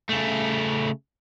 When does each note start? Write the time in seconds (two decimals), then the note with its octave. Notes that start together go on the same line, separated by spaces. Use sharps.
0.10 C#3 A3